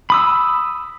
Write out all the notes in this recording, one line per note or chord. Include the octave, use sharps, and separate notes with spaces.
B5 D#6 E6